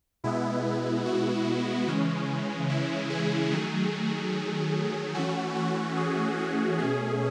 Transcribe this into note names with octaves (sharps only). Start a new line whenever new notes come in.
B2 G#3 B3 E4
F#4
C#3 E3 G#3 C#4
E4
G#4
D#3 F#3 A3 G#4
E3 A3 C#4 F#4
F#4
G#4
F#4
B2 A3 C#4 G#4